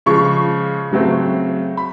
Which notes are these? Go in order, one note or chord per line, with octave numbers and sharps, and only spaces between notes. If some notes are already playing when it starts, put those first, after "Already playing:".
C#3 F3 G#3 C#6
C#3 F#3 A3 C4
B5